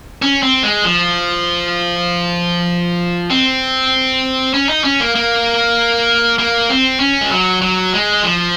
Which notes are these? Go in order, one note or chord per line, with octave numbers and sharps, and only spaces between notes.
C#4
C4
G#3
F3
C4
C#4
D#4
C#4
A#3
A#3
A#3
C4
C#4
G#3
F#3
F#3
G#3
F3